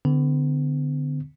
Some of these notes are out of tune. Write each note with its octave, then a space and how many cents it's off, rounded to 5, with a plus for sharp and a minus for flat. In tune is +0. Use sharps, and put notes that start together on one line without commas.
D3 +0 B3 +40